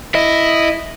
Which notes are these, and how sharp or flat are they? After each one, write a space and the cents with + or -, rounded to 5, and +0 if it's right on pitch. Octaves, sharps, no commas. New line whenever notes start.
E4 +0 D#5 +0